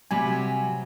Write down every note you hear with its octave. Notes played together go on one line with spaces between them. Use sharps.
C3 F#3 G3 G#5